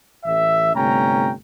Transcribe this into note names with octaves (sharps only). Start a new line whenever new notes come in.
A1 E5
G1 C3 A3 C#4 G5 A#5